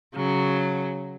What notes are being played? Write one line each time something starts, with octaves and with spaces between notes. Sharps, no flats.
C#3 F#3